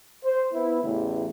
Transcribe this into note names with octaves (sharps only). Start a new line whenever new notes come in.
C5
B3 E4
A1 E2 C#3 E4